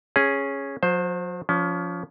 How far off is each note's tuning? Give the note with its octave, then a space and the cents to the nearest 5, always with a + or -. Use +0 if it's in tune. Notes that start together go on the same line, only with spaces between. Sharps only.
C#4 -5 G#4 +0
F#3 -45 C5 +0
F3 +5 C#4 +30